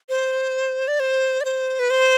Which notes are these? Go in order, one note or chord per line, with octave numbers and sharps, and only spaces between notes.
C5
D5
C5
D5
C5
B4
C5